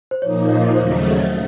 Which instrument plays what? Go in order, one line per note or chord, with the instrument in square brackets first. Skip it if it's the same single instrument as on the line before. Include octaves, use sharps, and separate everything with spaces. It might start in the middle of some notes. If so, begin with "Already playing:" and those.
[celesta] C5
[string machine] A#2 F3 A#3 D#4 [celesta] C#5
[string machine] D#2 C#3 F#3 A3 [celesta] C5